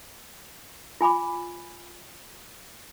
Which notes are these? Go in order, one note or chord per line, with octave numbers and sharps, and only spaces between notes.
F4 G#5 B5 D6